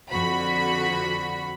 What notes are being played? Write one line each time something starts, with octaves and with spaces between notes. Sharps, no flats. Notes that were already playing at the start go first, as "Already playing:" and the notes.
F2 D3 F#4 B5